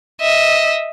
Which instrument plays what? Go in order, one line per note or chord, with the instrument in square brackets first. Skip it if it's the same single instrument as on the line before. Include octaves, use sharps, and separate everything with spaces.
[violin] D#5 E5